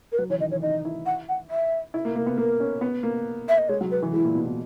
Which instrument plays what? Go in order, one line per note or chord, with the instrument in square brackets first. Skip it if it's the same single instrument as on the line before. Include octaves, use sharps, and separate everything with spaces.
[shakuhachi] A#4
[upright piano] F#3 [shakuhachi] B4
[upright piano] E3 [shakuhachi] C#5
[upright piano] D#3 [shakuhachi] D#5
[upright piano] E3 [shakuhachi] C#5
[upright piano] D#4 [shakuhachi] D#5
[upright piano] E4
[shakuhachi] F#5
F#5
E5
[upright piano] E4
A#3
A#3
B3
[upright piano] A#3 [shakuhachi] A#4
[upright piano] C#4
B3
A#3
[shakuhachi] E5
D#5
[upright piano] G#3 [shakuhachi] C#5
[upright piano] F#3
[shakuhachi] B4
[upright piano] E3
[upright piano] G#3 [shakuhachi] E4
[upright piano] A#2
B2
B2